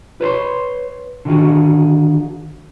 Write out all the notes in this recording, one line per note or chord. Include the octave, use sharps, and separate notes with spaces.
B4 C#5 B5 C6
D3 D#3 F#4 G#4